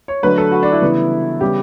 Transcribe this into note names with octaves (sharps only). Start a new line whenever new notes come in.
C#5
D3 F#3 A3 B4
A4
F#4
D4
E4
C#3 E3 G3 B3
C#3 G3 B3 G4